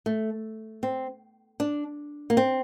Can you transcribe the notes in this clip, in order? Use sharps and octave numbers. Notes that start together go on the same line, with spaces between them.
A3
C4
D4
A#3
C4